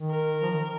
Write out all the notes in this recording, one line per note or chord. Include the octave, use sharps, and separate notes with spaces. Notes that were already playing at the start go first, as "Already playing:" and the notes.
Already playing: D#3
A#4
F3
D#3